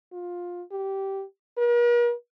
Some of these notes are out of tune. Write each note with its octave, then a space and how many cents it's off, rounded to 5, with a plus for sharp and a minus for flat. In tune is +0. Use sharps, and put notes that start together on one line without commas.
F4 +15
G4 -15
A#4 +45